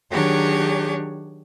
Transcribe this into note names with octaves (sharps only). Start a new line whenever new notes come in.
D#3 F#3 D4 G4 G#4 C#5